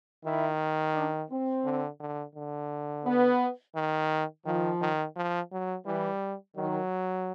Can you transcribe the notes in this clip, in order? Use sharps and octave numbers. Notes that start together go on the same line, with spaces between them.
D#3 E4
D4
C4
D3
D3
D3
B3
D#3
D#3 F3
D#3
F3
F#3
E3 G3
D#3 F#3